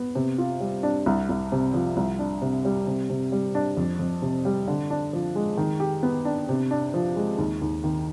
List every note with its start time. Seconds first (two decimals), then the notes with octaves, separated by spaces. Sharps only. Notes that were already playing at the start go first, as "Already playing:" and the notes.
Already playing: B3
0.15 C3
0.38 F4
0.60 G3
0.83 D4
1.06 C2
1.29 C2
1.52 C3
1.74 F3
1.97 C2
2.19 D4
2.42 C3
2.65 G3
2.87 C3
3.10 C3
3.32 G3
3.55 D4
3.77 F2
3.99 F2
4.22 C3
4.45 G3
4.68 D3
4.90 D4
5.13 F3
5.35 G#3
5.57 D#3
5.80 G4
6.03 B3
6.25 D4
6.49 C3
6.71 D4
6.94 F3
7.16 G#3
7.38 D#2
7.62 D#2
7.84 D#3